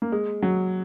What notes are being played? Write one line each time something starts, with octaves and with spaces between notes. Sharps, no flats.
A#3
G#3
F#3